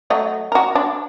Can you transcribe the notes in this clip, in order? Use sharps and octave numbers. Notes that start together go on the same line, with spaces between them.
F#3 A3 D#5
F#4 A#4
D4